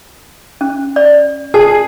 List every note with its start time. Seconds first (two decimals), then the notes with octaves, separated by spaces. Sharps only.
0.61 C#4
0.96 D5
1.54 G#4 A5